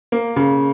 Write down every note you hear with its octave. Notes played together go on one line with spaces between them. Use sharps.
A#3
C#3